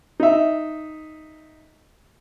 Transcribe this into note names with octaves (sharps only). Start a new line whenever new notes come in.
D#4 E5